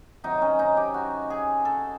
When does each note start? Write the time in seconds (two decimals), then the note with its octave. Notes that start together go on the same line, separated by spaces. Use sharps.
0.24 C3 D#3 F#3 D#4
0.42 C#4
0.59 D#4
0.77 G4
0.94 F#4
1.30 G#4
1.65 A4